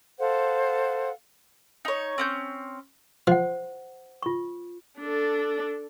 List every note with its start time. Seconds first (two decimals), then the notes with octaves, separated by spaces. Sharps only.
0.19 A4 C5 F5 F#5
1.85 D#4 C#5
2.18 C4 C#4 G6
3.27 F3 C5 F#5
4.22 F4 C#6
4.99 D4 A4